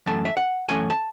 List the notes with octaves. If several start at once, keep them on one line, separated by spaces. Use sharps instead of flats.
F#2 E3 A3 A5
E5
F#5
F#2 E3 A3 C#4 G#5
A5